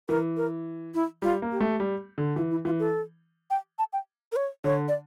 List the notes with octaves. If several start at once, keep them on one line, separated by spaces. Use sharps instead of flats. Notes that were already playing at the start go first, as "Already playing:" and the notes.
E3 A#4
A#4
E4
G3 F4
A#3
G4
A3
G3
D3
E3 F4
E4
E3 F4
A4
G5
A5
G5
A#4
C#5
D3 C#5
D5